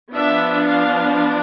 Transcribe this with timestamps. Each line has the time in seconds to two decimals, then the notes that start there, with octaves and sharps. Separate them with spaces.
0.13 F3 B3 D4 E5
0.67 F5